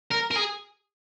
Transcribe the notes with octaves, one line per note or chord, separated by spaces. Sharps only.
A#4
A#4
G#4